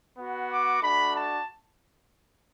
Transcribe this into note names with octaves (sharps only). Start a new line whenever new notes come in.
B3 F#4
D6
A3 D4 F#4 B5
A5